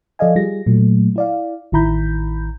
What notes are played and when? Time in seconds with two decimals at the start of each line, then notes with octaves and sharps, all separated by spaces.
0.19 F3 A4 D5 D#5 F5 G#5
0.36 G3 F4 G#4 A#6
0.66 A#2 F#3 A3
1.16 E4 D5 F5
1.72 A1 D#3 E4 A#5 B5 G6